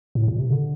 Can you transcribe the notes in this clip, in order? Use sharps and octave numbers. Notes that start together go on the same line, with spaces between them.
A2
A#2
C3
D3